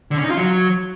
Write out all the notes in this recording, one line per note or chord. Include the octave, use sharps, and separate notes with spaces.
D3
C#4
D#4
F4
F#3